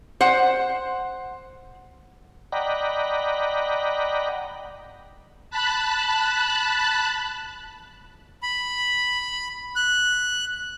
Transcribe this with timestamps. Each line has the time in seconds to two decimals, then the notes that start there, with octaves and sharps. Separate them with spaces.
0.21 C5 F#5
2.52 D5 D#5 F#5 G5 A#5 B5
5.50 A5 B5 F#6
8.43 B5
9.76 F#6